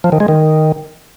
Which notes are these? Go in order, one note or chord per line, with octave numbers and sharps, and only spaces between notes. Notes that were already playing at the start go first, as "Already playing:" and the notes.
F3
D#3
G#3
D#3